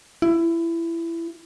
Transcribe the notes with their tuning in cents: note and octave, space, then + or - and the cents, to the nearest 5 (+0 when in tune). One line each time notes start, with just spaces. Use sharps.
E4 +20